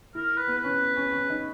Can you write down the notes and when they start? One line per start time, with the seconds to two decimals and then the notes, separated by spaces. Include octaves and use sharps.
0.15 E4 A#4
0.37 B4
0.48 B3
0.58 B4
0.64 C#4
0.97 C#4
1.12 C#4
1.30 D#4